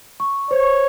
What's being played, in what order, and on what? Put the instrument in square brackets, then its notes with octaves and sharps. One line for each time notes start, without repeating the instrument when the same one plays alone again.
[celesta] C#6
[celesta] C5 [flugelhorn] C#5